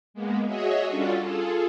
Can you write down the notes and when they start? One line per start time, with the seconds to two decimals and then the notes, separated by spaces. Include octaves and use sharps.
0.14 G#3 A#3 B3
0.46 F#4 G#4 C#5 D#5 E5
0.87 G3 C#4 D4 F4 F#4 A4
1.22 F4 G#4 A4